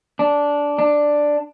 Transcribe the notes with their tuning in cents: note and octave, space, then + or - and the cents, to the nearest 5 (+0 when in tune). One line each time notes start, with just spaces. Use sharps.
D4 -10
D4 +5